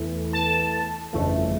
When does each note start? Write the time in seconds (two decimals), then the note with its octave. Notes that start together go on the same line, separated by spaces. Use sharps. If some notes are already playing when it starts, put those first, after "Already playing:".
Already playing: E2 E3 A3
0.33 A5
1.13 G1 F2 C#3 E3 A3